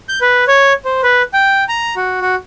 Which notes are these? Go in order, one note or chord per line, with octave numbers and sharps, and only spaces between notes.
G6
B4
C#5
C5
B4
G5
A#5
F#4
F#4